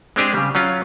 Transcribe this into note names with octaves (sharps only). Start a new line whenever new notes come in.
G#3 C4 D4 G4 G#4
C#3 G3
F#3 C#4 F4 F5